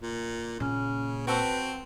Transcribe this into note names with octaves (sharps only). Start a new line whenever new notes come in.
A#2
A#2 C#3 C#4
C4 F#4 A4 B4 C5